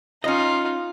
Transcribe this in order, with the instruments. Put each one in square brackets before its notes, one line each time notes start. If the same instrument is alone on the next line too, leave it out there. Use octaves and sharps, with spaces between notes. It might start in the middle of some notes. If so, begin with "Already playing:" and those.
[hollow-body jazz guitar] C#4 D#5 [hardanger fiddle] D#4 F4